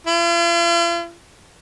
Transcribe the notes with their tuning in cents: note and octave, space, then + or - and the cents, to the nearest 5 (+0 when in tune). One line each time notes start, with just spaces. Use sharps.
F4 -45